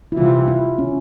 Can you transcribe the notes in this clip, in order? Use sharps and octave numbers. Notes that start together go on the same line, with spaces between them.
E4
C3 E3 G3 F4
E4
C#4